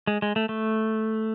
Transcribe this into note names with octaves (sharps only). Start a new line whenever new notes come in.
G#3
G#3
A3
A3